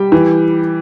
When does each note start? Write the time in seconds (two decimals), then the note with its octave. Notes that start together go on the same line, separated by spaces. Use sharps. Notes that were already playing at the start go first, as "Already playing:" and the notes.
Already playing: G3 G4 G5
0.12 E3